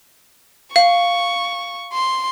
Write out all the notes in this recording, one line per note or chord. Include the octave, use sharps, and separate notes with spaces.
F5 C#6
C6